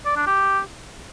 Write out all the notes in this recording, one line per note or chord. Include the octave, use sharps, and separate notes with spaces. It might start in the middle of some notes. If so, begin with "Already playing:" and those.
D5
D4
G4